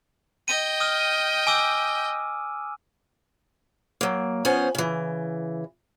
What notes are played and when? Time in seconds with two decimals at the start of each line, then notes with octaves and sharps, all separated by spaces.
0.48 D#5 G5 D#7
0.80 D#6 F6
1.47 G#5 D6 E6
4.01 F#3 A#3
4.45 F3 B3 C#4 C5 G#5
4.75 C#3 E3